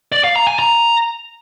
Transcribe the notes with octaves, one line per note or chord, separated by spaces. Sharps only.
D5
F5
A#5
G#5
A#5